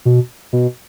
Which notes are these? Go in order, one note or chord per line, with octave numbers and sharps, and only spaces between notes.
B2
B2